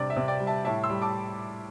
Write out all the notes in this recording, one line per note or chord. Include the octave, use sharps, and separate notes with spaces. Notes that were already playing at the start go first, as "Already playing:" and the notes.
Already playing: C3 G3 D4 D5
E5
C3
D5 G5
G3
E5 A5
A2 E5 A5
C6 E6
G3
A5 D6